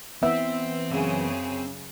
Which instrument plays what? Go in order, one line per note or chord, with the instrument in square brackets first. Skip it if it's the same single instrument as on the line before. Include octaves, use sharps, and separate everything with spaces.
[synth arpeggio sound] E3 B3 [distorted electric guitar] C4 [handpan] E5
[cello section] F#2 C#3 G#4